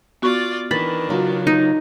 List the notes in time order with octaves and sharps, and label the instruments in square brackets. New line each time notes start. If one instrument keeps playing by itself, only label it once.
[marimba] B3 F#4 C#6 [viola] F4 D5
[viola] D#3 D4 [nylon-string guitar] E3 [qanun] B5 [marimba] A6
[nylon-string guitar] C#3 F#3 F4
[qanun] D#4